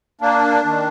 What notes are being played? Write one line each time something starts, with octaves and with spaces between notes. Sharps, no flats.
A#3 D4
D#3